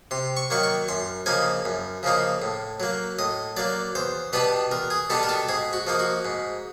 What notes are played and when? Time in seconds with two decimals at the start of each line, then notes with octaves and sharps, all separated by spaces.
0.11 C3 C6
0.37 C#6
0.50 D#3 F#3 A#3 C#6
0.63 C#6
0.88 F#2 C6
1.26 C#3 F3 A#3 D#4 G#5
1.65 F#2
2.03 C#3 F3 A#3 D#4
2.42 A2
2.80 F#3 A#3
3.19 A2 D#5
3.57 F#3 A#3 D5
3.95 E2 C5
4.33 B2 G3 B3 D4 B4
4.71 E2 A#4
4.90 G#4
5.10 B2 G3 B3 D4 A4
5.23 A#4
5.29 A4
5.49 G#2 G#4
5.73 F#4
5.87 F3 A#3 D#4
5.99 F#4
6.25 G#2